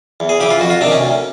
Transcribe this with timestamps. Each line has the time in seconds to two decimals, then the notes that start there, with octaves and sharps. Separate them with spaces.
0.20 E2
0.29 G#4
0.40 C#3 E3 G4
0.50 F4
0.60 F2 F#4
0.70 F4
0.81 C3 D4
0.84 D#3
0.91 C#4
1.01 D2